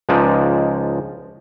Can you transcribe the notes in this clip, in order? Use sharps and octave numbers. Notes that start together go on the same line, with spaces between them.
C#2 F3 G#3 C#4 D#4 D5